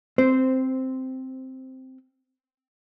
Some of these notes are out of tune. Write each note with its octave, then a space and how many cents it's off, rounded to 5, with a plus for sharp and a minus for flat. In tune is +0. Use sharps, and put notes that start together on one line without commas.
C4 +0 C5 -10